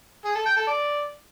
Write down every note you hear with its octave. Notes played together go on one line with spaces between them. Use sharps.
G#4
A4
G5
A4
D5